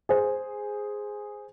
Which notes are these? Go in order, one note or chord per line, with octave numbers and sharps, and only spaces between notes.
G#4 C5